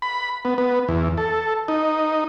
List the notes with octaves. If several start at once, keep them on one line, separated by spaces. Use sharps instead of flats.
B5
B3
B3
E2
A4
D#4